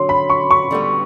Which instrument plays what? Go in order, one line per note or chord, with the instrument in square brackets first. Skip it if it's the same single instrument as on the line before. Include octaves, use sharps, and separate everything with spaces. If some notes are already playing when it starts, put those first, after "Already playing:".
Already playing: [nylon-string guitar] D3 F#3 [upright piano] C6
[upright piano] B5
C#6
C#6
[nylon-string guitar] D3 G3 B3